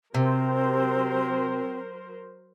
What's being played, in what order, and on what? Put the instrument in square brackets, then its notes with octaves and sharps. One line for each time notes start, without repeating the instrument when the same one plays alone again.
[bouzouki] C3 [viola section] F#3 A#4 C5 [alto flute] C4